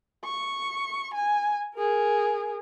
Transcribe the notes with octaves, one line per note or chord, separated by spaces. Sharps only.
C#6
G#5
G#4 A#4